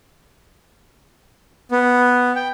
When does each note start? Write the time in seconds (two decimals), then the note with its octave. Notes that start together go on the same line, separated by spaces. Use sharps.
1.72 B3
2.36 G5